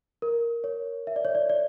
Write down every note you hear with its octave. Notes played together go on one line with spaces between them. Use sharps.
A#4
C#5
E5
D5
C#5
D5
D5